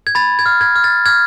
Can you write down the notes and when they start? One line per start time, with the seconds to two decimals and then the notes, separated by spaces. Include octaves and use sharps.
0.07 G#6
0.15 B5 A6
0.39 G#6
0.46 F6
0.61 G#6
0.76 F6
0.84 A6
1.06 F6 G#6